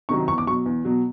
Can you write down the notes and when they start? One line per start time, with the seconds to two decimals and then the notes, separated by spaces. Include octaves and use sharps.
0.09 C3 D#3 F#3 C#6
0.28 E2 C#6
0.38 D6
0.47 B2 F#3 C#6
0.66 E2
0.85 B2 F#3